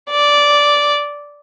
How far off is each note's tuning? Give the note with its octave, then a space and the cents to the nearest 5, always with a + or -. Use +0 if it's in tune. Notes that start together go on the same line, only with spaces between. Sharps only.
D5 -10